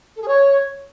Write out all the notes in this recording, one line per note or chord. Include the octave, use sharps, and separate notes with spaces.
A4
G#4
C#5